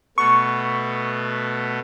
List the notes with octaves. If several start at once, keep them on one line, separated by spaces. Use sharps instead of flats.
B2 A3 B3 C#6